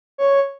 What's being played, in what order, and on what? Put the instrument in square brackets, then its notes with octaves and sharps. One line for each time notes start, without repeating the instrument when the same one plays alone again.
[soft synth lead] C#5